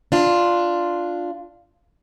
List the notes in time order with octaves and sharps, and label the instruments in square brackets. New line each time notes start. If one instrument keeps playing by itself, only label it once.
[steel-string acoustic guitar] D4 F4